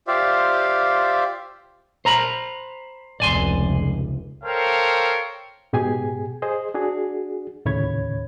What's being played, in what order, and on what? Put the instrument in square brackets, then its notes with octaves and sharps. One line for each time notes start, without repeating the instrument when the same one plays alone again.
[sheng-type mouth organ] F4 G4 C5 D5 E5 F5
[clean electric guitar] C5 A#5 B5
[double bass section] F1 C#2 [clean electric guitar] D5 G#5 C6
[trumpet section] A4 A#4 C5 C#5 F5 G5
[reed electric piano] G#2 B2 G4 G#4 G#5
G#4 C5 D#5
D4 F#4 G#4
D#2 A2 C#3 C#5 B5 G#6